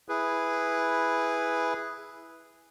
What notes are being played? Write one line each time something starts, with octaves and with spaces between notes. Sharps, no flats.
E4 G#4 B4